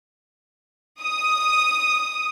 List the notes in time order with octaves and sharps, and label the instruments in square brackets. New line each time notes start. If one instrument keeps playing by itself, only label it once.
[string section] D#6